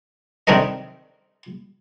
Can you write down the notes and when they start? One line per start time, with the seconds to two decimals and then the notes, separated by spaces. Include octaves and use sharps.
0.47 C3 D#3 C4 D4 A#4 D#5